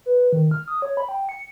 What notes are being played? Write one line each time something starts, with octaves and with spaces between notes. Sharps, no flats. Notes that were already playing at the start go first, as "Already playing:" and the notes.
B4
D#3
F6
D#6
C#5
B5
G5
C#7